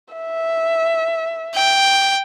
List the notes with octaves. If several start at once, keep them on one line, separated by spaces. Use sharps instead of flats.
E5
G5